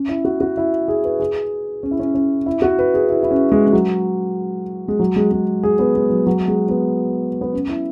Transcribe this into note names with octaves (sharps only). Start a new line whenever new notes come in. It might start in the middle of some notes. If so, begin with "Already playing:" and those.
Already playing: C#4
E4
F#4
F#4
E4
G#4
B4
G#4
C#4
E4
C#4
C#4
E4
F#4
B4
G#4
E4
E4
C#4
G#3
G#3
F#3
G#3
F#3
G#3
G#3
G#4
B3
G#3
F#3
F#3
G#3
B3
B3
C#4
E4